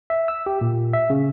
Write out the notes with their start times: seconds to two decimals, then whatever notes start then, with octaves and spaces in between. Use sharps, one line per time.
0.10 E5
0.28 E6
0.46 G4
0.61 A#2
0.93 E5
1.10 C#3